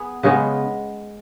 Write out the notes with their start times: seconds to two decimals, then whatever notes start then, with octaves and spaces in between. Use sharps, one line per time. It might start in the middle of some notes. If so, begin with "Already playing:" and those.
Already playing: B3 G#4
0.23 C#3 G#3 B3 B4